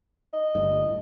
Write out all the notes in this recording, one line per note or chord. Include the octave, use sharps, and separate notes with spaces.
D#5
G1 D2 G2
A2